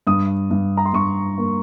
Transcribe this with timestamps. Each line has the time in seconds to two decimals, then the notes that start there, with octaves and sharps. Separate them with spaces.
0.07 G2 D#6
0.51 G2
0.77 A#5
0.86 C6
0.93 G2 C#6
1.38 A#3